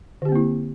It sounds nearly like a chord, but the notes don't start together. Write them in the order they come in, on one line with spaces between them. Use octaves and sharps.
D3 G4 C4 A#3 E4